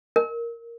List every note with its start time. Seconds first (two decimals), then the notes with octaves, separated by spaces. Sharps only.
0.16 A#4